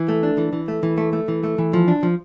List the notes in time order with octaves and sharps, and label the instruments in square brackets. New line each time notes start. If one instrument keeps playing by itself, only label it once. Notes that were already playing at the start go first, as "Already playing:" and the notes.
Already playing: [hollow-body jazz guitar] E3
A3
D4
E3
E3
A3
E3
A3
A3
E3
A3
E3
F3
D4
F3